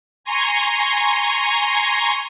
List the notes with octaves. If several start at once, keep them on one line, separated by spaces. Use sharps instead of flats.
G#5 A#5 C6 C#6